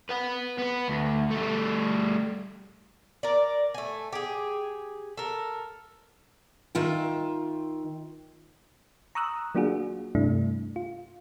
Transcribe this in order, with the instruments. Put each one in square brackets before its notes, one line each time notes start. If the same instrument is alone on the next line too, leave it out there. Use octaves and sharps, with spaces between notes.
[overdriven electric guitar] B4 F#5
B3 B4
D2
G3 A3
[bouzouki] A#4 D5
A3 G#5
G4 G#4
A4 A#4
[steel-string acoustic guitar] D#3 F4 E5 G5
[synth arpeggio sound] A#5 C#6 D#6 E6 F#6
F#3 A#3 D4 F4 F#4 G#4
G2 C3 G3 A3 D4 E4
F4